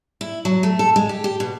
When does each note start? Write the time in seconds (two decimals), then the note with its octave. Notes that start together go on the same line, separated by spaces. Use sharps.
0.21 E4
0.45 F#3
0.63 A3
0.79 A4
0.96 G#3
1.09 G4
1.24 G4
1.40 B2